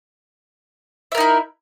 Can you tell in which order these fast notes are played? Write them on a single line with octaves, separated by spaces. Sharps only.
E5 A#4 D#4 E4